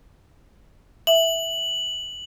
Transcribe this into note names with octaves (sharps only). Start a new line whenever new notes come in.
E5 F#7